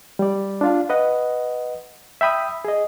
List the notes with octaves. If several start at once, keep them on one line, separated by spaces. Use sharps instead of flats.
G3 D5
D4 F4 F5
B4 D#5 F#5
E5 G5 B5 D#6 E6
G#4 D#5